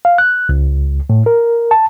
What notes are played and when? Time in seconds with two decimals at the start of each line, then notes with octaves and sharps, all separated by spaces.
0.05 F5
0.18 F#6
0.49 C#2
1.10 A2
1.26 A#4
1.71 A5